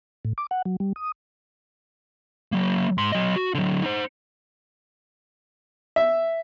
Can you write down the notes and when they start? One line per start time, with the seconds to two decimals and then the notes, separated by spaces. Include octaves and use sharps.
0.25 A2
0.38 D6
0.51 F#5
0.65 F#3
0.80 G3
0.96 D#6
2.52 F#3 A#3
2.98 G#2 C6
3.12 F#3 D#5
3.36 F#4
3.55 D3 F#3
3.82 D#4 C5
5.96 E5